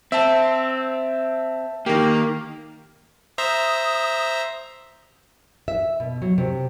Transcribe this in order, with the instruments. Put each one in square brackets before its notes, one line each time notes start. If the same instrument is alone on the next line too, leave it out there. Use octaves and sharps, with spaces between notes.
[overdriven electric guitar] C4 [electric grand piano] E5 A5
[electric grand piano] D#3 G4 [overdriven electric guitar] A#3
[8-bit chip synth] C5 E5 A#5 [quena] D#6
[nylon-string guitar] E5
B2
F#3
C3